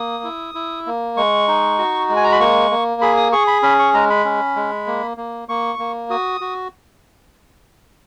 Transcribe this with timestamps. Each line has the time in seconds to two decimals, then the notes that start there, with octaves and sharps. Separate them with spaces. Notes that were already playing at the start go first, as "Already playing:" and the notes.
Already playing: A#3 D#6
0.24 E4
0.55 E4
0.86 A#3
1.17 G#3 C#6
1.48 D#4
1.78 F#4
2.09 G#3
2.17 G#5
2.24 A#5
2.32 B5
2.40 A#3 C#6
2.71 A#3
3.01 G#4 B5
3.17 D#6
3.32 G#4 C#6
3.47 B5
3.63 C#4 B5
3.79 C#6
3.94 G#3 A#5
4.10 B5
4.25 C#4
4.56 G#3
4.87 A#3
5.17 A#3
5.48 A#3 C#6
5.79 A#3
6.10 F#4 D#6
6.41 F#4